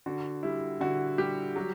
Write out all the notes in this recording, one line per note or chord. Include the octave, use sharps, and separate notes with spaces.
D3 F#4
G3 E4
D3 F#4
G3 G4
F#3